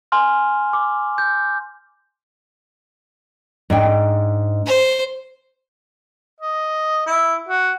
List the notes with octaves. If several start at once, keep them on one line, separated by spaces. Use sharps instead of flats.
G#5 C6 F6
D6
G6
G#2 D4 G5
C5
D#5
E4
F#4